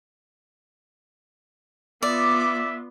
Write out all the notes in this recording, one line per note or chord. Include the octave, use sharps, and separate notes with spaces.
B3 F4 D5 E5 D6